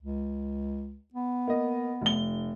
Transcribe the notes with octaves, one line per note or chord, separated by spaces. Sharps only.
C#2
B3
A#3 D#5
F1 G7